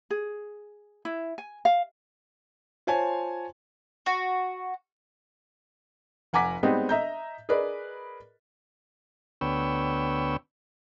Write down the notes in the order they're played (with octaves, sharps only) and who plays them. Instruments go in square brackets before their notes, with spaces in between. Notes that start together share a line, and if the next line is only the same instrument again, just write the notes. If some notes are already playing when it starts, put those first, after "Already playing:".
[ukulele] G#4
E4
G#5
F5
[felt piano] F4 C5 C#5 G#5 A5
[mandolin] F#4
[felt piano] F1 F#5 G#5 A#5 D6 B6
G3 G#3 B3 C4 D#4 G4
D#5 E5 A#5 G6
G#4 A#4 B4 D5 D#5
[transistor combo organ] D2 B3 C#5 G5 E6